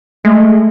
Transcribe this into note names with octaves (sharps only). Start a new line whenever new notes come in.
G#3 A3